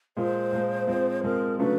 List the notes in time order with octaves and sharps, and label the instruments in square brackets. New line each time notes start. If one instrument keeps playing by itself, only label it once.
[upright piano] A#2 F3 G#3 [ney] C5
[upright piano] A#2 F3 G#3
F3 G#3 C4
[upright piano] F3 G#3 C4 [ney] A#4
[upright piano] C#3 F#3 A3 D4 F#4 [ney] B4